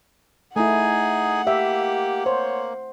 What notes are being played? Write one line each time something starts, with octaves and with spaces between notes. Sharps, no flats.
A3 D#4 E4 G#4 F#5 G#5
A#3 G4 E5
C5 C#5